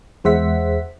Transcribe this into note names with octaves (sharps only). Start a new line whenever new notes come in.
E2 G#3 C5 E5 F#5 B6